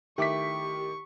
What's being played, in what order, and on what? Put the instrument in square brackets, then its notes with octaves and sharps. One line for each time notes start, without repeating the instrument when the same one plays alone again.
[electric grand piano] D#3 D6 B6 [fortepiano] A3 E4 [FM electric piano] G4 [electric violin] C#6